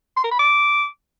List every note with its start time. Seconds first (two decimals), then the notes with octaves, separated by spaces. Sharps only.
0.16 C6
0.24 A#4
0.31 B5
0.39 D6